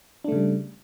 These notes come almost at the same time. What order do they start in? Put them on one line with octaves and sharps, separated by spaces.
D4 A3 C#3 G3